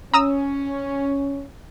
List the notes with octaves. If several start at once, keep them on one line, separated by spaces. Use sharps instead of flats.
C#4 A#5 D#6 E6